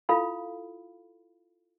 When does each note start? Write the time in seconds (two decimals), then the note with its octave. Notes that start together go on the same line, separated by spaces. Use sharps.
0.09 E4 F4 A4 F5 B5